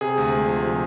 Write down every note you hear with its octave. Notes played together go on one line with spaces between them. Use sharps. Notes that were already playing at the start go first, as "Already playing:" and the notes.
C3 G#4
D2
G#3
F3
C3